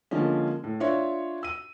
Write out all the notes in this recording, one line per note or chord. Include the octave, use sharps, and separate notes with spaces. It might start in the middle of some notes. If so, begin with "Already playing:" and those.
D3 F3 G#3 A#3 C#4
A2
D4 F4 C#5 E5
E6 D#7